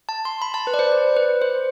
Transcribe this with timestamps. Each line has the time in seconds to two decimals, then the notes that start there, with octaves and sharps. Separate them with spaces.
0.09 A5
0.25 C6
0.42 B5
0.54 A5
0.67 B4
0.74 D5
0.79 C5
0.92 D5
1.17 B4
1.42 C5